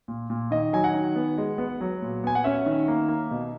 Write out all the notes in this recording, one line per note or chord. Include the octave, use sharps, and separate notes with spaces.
A#2
A#2
D#3 D#5
F#3 G#5
F#5
D#3
B3
G#3
B3
F#3
A#2
B3 G#5
F#5
C#4 E5
D#3
A#3
A#3
B2